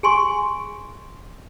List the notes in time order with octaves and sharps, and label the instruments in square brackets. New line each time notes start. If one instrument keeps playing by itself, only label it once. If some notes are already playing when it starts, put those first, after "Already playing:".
[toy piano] G#4 G#5 C6 C#6